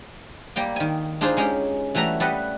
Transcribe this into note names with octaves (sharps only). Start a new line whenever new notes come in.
G3 A#3 G5
D#3 G#5
D4 D#4 F4 G#4 C5
G#3 C#4 G4 G#4 G5
E3 G3 A3 F#4 A#5
G3 A4 B4 D#5 F#5